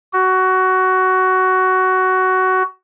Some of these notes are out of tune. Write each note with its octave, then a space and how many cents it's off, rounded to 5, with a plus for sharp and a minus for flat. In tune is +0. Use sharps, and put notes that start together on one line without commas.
F#4 +15